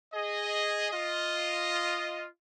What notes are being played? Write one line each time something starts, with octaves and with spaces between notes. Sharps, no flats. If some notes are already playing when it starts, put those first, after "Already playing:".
G#4 D#5
F4 D#5